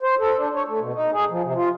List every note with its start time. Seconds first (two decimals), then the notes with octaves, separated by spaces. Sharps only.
0.03 C5
0.19 A4
0.37 D4
0.55 C#5
0.68 A3
0.80 B2
0.94 D#4
1.13 G#4
1.31 F3
1.43 C3
1.57 F4